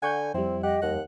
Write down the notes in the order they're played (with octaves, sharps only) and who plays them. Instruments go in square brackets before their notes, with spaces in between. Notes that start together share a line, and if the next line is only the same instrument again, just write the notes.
[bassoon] D3 [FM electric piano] F#5 C#6 G6 [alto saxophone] G#5
[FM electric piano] F2 G3 [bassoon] C4 [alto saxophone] E4
[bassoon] G4 [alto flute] D#5 [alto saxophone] F#5
[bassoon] D#2 [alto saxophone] F#5